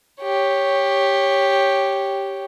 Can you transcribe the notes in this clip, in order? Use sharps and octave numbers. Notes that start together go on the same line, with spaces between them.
G4 C#5